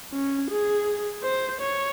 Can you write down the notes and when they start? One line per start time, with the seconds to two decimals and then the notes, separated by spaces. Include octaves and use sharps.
0.13 C#4
0.50 G#4
1.23 C5
1.61 C#5